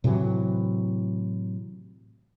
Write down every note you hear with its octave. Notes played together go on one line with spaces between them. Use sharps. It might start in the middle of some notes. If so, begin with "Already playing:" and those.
A2 C3 E3 F#3